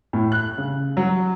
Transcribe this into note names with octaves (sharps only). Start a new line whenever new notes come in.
A2
F#6
C#3
F#3